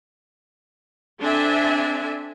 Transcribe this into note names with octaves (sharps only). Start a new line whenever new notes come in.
C4 D4 A4 E5 G#5